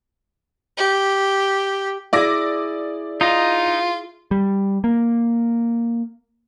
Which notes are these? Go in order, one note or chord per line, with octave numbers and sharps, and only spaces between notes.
G4
E4 G#4 D5 D6 A#6
D#4 F4 D#5 A#5
G3
A#3